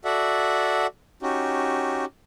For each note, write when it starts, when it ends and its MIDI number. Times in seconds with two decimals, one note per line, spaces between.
0.05 0.87 66
0.05 0.87 69
0.05 0.87 74
0.05 0.87 76
0.05 0.87 78
1.22 2.05 61
1.22 2.05 63
1.22 2.05 66
1.22 2.05 67